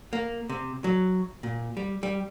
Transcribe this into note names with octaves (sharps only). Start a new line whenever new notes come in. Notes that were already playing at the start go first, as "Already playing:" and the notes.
A#3
C3
F#3
A#2
G3
G3